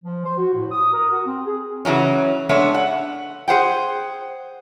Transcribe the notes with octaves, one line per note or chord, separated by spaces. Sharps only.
F3
C5
F#4
A2
D#6
A#4
F#4
C4
G#4
C#3 E3 F#3 C#4
G#3 A3 B3 D4 C#5
F#5
G#4 C5 F#5 G5